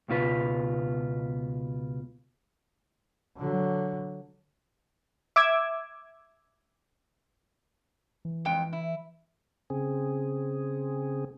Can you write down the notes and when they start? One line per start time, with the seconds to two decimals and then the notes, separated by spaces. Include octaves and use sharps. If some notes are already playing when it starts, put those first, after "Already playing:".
0.08 C#2 B2 F4 B4
3.38 D3 F#3
5.36 E5 D6 E6 G#6
8.25 E3
8.45 F2 G#3 G5
8.73 E4
9.70 C#3 C4 G#4